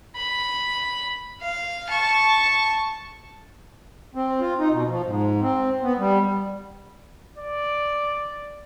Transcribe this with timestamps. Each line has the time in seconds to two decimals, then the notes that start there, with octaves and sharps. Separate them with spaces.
0.16 B5
1.41 F5
1.90 A5 C#6
4.15 C4
4.40 F4
4.58 D#4
4.71 B2
4.89 F3
5.04 G#2
5.41 C4
5.82 B3
5.98 G3
7.37 D5